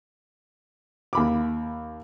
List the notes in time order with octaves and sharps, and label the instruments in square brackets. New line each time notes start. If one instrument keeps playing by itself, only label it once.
[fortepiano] D#2 B5 D6